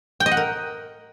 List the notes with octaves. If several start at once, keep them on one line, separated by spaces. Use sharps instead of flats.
G5
D#5
F#5
A#4